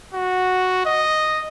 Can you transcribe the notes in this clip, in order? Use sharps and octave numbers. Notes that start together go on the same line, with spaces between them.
F#4
D#5